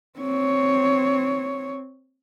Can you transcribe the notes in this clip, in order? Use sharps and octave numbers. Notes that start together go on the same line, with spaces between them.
C4 C#5